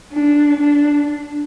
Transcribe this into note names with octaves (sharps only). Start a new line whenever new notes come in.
D4
D4